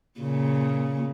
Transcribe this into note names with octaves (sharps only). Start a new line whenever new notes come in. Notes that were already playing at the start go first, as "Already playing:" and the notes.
A#2 C#3